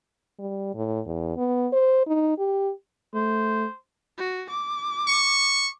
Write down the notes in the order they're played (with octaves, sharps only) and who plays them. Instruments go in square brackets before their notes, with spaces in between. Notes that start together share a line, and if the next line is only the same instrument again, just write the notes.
[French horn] G3
A2
E2
B3
C5
D#4
G4
[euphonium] A3 [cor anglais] C5
[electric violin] F#4
D6
[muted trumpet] C#6